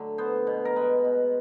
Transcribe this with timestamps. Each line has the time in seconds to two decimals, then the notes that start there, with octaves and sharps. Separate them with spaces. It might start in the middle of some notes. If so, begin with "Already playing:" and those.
Already playing: D3 F#3 A3
0.18 B3 C5
0.47 B2
0.65 A#4
0.76 G#3 B4
1.05 B2